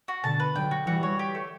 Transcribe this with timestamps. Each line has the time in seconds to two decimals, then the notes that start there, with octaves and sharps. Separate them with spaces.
0.08 F#4
0.24 B2 D3 A5
0.40 B4
0.56 D3 F#3 G5
0.71 F#4
0.87 E3 G3 F#4
1.03 C#5
1.19 G4
1.35 A3